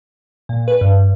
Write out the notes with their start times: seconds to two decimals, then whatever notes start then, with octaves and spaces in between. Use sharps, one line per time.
0.49 A#2
0.68 B4
0.81 G2